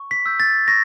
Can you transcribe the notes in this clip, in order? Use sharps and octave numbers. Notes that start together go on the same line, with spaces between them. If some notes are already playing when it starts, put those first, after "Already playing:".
Already playing: C#6
B6
E6 G6
A6
C#6 A#6